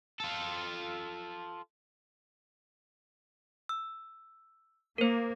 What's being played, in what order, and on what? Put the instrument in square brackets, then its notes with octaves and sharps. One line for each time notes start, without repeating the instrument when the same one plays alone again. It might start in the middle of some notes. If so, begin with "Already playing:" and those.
[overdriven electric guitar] F4 A4
[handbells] E6
[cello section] A#3 [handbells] A#4 C5